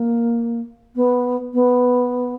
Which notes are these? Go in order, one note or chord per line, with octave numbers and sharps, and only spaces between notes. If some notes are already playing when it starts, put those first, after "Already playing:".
Already playing: A#3
B3
B3